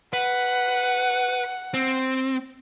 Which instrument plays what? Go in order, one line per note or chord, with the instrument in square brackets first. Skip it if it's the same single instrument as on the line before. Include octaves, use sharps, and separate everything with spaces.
[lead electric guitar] B4 [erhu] F#5
[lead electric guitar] C4